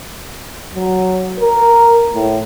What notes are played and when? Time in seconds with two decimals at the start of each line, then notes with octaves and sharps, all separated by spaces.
0.75 F#3
1.39 A#4
2.13 A2